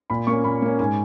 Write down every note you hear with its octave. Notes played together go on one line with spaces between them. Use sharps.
A#2 B5
A#3 C#4 C#6
A#2 B5
A#3 C#4
G#2 G#5